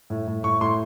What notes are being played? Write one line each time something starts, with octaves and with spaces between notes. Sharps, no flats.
A2
A2
A2 C#6
A2 C6